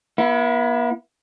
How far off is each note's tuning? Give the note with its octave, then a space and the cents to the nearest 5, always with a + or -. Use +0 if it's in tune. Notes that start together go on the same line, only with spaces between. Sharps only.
B3 -45 E4 +15